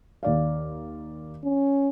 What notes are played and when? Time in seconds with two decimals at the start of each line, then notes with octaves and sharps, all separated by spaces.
0.23 D#2 D5 F5
1.44 C#4